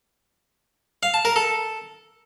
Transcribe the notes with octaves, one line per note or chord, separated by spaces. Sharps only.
F5
A5
A#4
A4